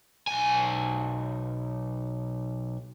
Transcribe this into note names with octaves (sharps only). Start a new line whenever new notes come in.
B1 G#5